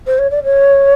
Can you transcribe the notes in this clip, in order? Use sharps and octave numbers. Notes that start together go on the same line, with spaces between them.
C5
C#5
D5
C#5